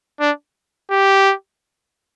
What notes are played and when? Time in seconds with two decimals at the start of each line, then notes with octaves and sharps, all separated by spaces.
0.20 D4
0.91 G4